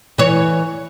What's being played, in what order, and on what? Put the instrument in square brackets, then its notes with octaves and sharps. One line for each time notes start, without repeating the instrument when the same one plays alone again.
[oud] E3 C#5